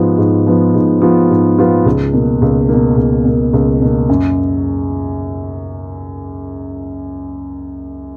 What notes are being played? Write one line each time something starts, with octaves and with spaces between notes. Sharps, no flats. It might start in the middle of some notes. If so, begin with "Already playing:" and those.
Already playing: G#2 F3 B3 F4
G#2
F3 B3 F4
G#2
F3 B3 F4
G#2
F3 B3 F4
C#2
B2 A#3
C#2
B2 A#3
C#2
B2 A#3
C#2
B2 A#3
F#2